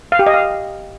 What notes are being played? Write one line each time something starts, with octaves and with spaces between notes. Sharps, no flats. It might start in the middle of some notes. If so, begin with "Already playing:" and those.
F5
G4
D#5
F5